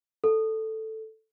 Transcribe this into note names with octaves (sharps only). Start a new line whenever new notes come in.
A4